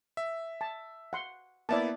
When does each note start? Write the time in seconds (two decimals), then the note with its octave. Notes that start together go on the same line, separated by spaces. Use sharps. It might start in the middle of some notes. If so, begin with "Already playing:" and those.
0.17 E5
0.61 A5
1.13 F#5 C6
1.69 A#3 B3 E4 D5 E5 A5